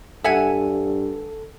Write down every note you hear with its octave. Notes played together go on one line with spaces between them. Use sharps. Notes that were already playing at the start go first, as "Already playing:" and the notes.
G2 A4 E5 F#5 G#5